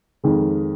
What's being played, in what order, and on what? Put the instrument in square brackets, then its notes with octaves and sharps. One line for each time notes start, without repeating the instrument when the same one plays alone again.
[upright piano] F2 D#3 G#3